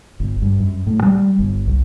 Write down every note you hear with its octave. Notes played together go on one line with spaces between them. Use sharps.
G1
G2
F#2
A2
G3
G1
C2